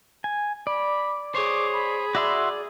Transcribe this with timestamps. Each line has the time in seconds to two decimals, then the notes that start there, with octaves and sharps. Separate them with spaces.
0.24 G#5
0.67 D5 B5
1.35 G#4 C5 C#5 D6
1.73 B5
2.15 F#4 D5 E5 C6